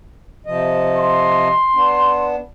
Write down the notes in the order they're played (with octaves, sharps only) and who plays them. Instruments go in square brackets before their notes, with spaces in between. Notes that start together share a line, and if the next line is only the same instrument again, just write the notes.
[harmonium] C3 F3 D#5
[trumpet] C6
[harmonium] B3 D4